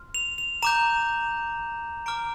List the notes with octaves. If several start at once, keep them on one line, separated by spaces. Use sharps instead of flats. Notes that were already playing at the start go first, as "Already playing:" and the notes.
Already playing: C6 F6
F7
F7
A#5 D6 G6 E7
A#5 D6 F6 D7